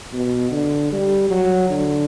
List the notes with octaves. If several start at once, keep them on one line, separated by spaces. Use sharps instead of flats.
B2
D3
G3
F#3
D3